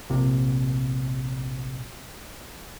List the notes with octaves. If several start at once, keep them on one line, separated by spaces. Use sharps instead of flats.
A#1 C3